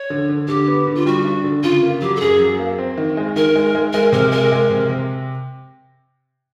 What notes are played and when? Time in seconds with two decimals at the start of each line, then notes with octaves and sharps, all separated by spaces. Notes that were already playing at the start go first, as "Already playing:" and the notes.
Already playing: C#5
0.10 D3
0.29 D3
0.48 D3 G4
0.68 B3
0.87 D3
0.95 F4
1.06 G3 F#4
1.25 D4
1.44 D3
1.63 C#3 F4
1.83 A#3
2.01 F#3 G4
2.16 A4
2.20 F#2 G#4
2.40 F#3
2.59 A#3
2.78 C4
2.98 D#3
3.17 G#3
3.36 D#3 A#4
3.55 G#3
3.75 G#3
3.93 G#3 A#4
4.12 C3 A#4
4.32 G#3 A#4
4.52 G#3
4.71 C3
4.90 C3